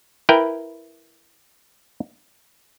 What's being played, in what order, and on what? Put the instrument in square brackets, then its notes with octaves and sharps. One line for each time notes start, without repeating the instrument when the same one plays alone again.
[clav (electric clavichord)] E4 A#4 B4 G5